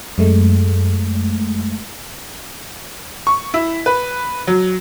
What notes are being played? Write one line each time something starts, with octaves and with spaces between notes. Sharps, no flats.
F#2 G#3 A3
C#6
E4
B4
F#3